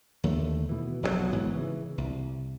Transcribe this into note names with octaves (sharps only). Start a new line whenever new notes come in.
D#2 D3 A3
B2 E3
F1 B1 A#2 F#3
G#1 G#2 E3 B3
C#3 E3
C2